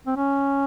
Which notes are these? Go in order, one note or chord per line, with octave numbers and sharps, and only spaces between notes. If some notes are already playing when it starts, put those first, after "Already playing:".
C4
C#4